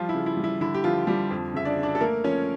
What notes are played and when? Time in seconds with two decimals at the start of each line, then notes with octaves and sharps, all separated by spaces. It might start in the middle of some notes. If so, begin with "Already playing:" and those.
Already playing: F3 G3 F4
0.09 E4
0.14 C#3
0.26 E4
0.37 G3
0.44 E4
0.61 D3 E4
0.74 G4
0.84 D3 F3 F4
1.07 F3 G3 G4
1.31 F2
1.54 C#3 E5
1.65 D4 D5
1.77 C#3
1.83 D4 D5
1.95 A4
2.01 A3 A#3 A#4
2.24 F3 C#4 C#5